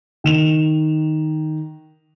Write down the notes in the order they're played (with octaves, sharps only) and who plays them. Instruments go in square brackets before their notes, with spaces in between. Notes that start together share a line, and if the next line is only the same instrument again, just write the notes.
[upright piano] D#3 E7 F7